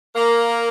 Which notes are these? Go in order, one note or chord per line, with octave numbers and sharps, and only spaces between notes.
A#3